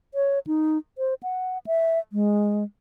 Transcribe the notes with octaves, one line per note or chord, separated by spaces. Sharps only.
C#5
D#4
C5
F#5
E5
G#3